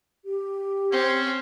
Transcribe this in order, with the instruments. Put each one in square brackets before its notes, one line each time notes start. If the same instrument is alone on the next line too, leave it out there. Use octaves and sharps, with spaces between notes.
[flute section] G4
[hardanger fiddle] C4 [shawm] C#4